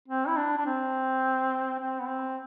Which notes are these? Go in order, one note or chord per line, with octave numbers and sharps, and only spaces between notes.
C4
E4
D4
D4
C4
C4
B3
C4